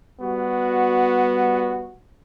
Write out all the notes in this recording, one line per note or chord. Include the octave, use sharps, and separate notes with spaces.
G3 B3 F#4